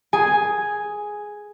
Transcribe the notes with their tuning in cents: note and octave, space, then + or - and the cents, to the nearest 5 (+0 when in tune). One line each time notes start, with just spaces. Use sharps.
G#4 +5 G#5 +0